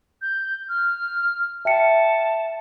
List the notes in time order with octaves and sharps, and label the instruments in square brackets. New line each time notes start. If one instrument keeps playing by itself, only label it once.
[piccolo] G6
F6
[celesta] E5 G5 C#7 [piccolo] A5